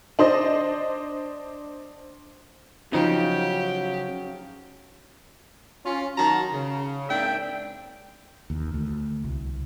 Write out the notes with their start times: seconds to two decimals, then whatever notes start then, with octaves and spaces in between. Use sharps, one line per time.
0.19 D4 C5 D#5
2.93 C#3 F3 F#3 D#4 G4
5.86 C#4 F4
6.18 D#3 F#3 F#4 A5 A#5
6.53 C#3
7.09 G#2 A#3 C4 D4 E5 G5
8.50 D#2
8.74 D2
9.24 C2